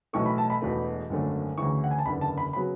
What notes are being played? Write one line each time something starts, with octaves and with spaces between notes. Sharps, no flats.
B1 A2 E3 A3 C#6
B5
A5
B5
E1 E2 B2 A3
G#1 F#2 D3 A3
D2 C#3 E3 C#6
F#5
G#5
A5
F#1 E2 D3 B5
A5
B5
C#3 F#3 B3 B5